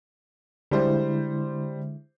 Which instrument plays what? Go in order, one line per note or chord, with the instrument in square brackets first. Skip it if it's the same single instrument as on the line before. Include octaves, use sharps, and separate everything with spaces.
[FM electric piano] D3 G#3 E4 [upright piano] G3 C5